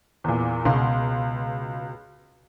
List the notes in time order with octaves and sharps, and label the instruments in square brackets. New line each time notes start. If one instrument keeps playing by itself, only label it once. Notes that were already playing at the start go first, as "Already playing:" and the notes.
[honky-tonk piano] E2 A#2
[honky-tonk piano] C#2 C6 [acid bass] B2